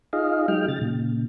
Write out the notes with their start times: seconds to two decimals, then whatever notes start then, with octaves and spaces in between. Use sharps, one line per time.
0.13 D#4 F4 G#4 D#5 F5
0.48 F#3 G#3 D#4 G5 F6
0.68 C#3 A6
0.82 A#2 C#3